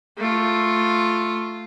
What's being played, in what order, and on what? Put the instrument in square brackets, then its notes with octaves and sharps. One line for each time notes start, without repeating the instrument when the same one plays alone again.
[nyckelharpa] A3 F4